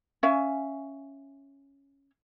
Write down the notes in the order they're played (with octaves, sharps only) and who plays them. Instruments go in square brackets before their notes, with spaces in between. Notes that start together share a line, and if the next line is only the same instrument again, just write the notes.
[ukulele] C#4 E5 F5 G#5